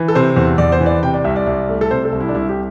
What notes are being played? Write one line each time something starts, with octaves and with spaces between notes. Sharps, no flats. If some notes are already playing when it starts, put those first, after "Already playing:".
Already playing: E3
A4
C3 C5
E2
E2 D5
C5
E3
D5
C3 G5
D5
C2 E5
D5
C2
A3
A4
C3 C5
A4
C2
E4
D4
C2 E4
G4